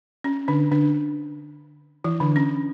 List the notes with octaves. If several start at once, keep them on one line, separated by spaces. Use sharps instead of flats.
C#4
D3 D4
D3 D4
E3 E4
D3 D4
C#4